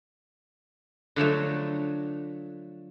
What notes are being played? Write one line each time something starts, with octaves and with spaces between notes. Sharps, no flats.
D3 F3 F#3 A3